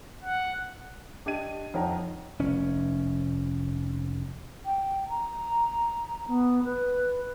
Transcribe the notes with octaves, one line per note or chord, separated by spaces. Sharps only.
F#5
D4 G4 D#5 G#6 D#7
F2 D#4 C#5 F#5 G5 A#5
F1 C#4
G5
A#5
B3
B4